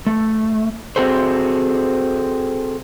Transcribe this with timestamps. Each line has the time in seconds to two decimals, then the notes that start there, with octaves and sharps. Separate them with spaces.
0.07 A3
0.96 C4 F#4 G#4 A4 C5